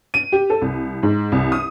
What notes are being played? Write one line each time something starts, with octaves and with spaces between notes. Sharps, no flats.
D#7
G4
A4
C2
G#2
C2
D#6